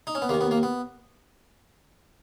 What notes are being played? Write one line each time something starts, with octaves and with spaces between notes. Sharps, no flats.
D#4
C#4
B3
D#2 D#3 A#3
B3
A#3
B3